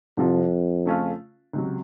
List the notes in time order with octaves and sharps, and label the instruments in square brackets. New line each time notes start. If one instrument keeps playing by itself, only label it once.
[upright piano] C2 C3 F3 [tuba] F2
[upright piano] C#3 A3 C#4 F4
C#2 C3 F#3